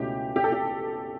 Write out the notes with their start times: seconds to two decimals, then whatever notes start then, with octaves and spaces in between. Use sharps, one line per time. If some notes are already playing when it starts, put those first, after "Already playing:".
Already playing: C#2 B2 A3 C#4 E4 G4
0.36 G4
0.44 A4
0.52 G4